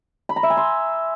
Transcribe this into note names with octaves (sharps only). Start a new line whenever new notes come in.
B5
A#5
E5
G#5
C6